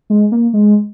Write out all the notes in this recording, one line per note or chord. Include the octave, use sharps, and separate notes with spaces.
G#3
A#3
G#3